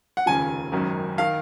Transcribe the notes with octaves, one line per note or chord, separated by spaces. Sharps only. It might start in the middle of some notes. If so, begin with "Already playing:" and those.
F#5
F1 D#2 C#3 F3 G#5
G#1 F#2 D#3 F#3
D#3 F5